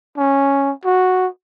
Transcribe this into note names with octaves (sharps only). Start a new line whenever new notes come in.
C#4
F#4